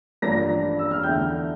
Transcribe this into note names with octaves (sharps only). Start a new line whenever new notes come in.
A1 G2 F3 A#3 D4 A#5 A#6
E6
F6
E2 D3 A3 E4 G5 G6